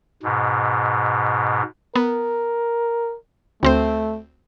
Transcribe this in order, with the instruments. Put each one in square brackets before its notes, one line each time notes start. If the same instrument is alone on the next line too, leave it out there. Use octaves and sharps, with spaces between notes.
[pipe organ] G#2 B2
[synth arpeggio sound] B3 [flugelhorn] A#4
[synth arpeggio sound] D2 C4 C5 [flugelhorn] A3